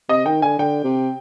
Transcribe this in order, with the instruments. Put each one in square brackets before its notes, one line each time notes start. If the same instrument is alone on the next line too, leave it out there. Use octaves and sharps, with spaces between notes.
[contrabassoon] C3 [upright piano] D#5
[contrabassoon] D#3 [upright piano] G5
[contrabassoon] D3 [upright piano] G#5
[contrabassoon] D3 [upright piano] G5
[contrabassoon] C3